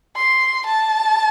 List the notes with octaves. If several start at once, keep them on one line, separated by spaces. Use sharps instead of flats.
C6
A5